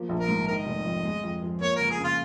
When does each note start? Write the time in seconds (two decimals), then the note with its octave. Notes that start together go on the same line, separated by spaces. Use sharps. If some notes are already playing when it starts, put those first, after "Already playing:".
Already playing: F3 A#3
0.09 A#1
0.20 A#4
0.28 G#2
0.48 D#3 A#4 D#5
0.66 F1
0.86 F2
1.05 G#3
1.24 F2
1.42 F3
1.61 A#3 C#5
1.76 C#2 A#4
1.90 G#4
2.00 C#3 F4